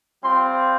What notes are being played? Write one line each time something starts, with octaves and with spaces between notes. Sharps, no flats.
G3 C4 F4 C6